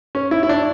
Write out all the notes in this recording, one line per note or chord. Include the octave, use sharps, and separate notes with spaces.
C#4
E4
E4
D4